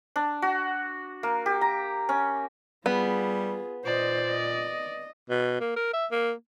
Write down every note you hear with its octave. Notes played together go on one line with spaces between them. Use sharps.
D4
F#4
A#3
G4
A#5
C#4
G3 B3 F4 G#4
A#2 C5 D5 D#5
D#5
B2
A#3
A#4
E5
A#3